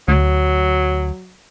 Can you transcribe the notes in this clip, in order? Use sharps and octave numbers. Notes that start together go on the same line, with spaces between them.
D2 F#3